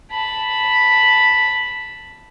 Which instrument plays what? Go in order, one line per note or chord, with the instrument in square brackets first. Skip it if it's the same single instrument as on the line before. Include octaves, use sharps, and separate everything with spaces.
[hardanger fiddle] A5 B5